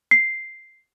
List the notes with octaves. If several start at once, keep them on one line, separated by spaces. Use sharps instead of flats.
C7